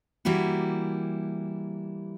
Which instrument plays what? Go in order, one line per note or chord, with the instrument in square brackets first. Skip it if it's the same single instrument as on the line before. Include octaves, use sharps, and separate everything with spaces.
[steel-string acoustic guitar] E3 G3 A#3 E4 F#4